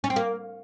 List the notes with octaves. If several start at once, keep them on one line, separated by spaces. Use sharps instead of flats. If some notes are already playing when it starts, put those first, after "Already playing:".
C#4
C4
A#3